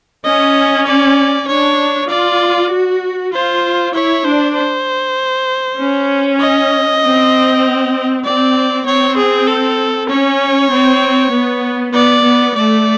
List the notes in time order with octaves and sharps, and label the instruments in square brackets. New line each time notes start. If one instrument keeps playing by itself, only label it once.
[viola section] C#4 [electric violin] D#5
[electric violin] D5
[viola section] D4 [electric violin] C#5
[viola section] F4 [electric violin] D5
[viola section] F#4
[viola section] F4 [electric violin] C5
[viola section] E4 [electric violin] C#5
[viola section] D4 [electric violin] C5
[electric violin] C5
[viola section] C#4
[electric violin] D#5
[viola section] C4
[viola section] C4 [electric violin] D5
[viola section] C4 [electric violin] C#5
[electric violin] G#4
A4
[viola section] C#4 [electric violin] C#5
[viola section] C4
B3
[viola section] B3 [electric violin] D5
[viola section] B3
[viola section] A3 [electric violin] D5